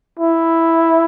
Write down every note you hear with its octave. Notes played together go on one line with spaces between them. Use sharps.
E4